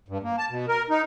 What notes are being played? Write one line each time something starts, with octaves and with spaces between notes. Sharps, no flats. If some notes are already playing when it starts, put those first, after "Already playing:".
G2
A#3
A5
B2
A#4
D#4